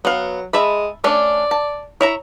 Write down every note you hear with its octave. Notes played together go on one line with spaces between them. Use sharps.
F#3 B3 F5
G#3 E5 A5 B5
A3 C#4 D4 D5
A5
E4 C#5 E5 A#5